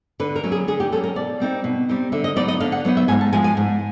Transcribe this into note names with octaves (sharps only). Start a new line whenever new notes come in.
D3 B4
A#4
F#3 A#3 C#4
G#4
D3 G#4
G4
F#3 A#3 C#4 A4
A#4
B2 D5
G3 C4 D#4
B2
G3 C4 D#4
D3 E5
D#5
F#3 B3 D#4 D5
D#5
D3 F5
F#5
F#3 B3 D#4
E5
G#2 G#5
A5
F3 G#3 G#5
G#5
G#2